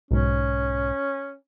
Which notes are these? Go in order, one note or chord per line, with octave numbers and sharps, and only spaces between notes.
B1 G#2 C#4